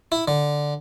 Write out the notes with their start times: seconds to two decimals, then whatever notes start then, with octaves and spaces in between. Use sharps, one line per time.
0.12 E4
0.28 D3